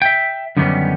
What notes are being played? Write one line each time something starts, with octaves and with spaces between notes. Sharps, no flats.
E5 G5
F#2 D3 D#3 G3 B3 C#4